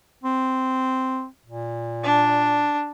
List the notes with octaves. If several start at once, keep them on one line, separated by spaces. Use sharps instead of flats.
C4
A#2
D4